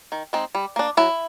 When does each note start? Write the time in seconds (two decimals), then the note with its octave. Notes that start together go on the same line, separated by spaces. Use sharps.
0.12 D#3
0.33 G#3 C4 D#4
0.55 G3
0.76 A#3 D4
0.97 F#3 E4